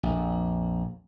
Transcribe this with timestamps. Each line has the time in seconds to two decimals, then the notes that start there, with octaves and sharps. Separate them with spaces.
0.03 A#1 F2